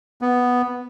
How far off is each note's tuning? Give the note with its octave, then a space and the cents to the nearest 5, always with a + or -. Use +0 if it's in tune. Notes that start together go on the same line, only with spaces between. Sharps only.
B3 +0